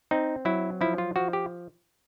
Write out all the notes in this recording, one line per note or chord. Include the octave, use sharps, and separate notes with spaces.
C4 D#4
F#3 E4
F3 E4
F4
F3 F#4
G4